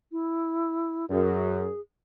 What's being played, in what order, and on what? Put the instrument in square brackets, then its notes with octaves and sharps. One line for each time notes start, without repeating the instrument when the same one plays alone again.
[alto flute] E4
[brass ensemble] F#2 [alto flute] G#4